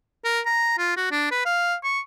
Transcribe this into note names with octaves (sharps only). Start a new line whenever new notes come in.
A#4
A#5
F4
F#4
D4
B4
F5
C#6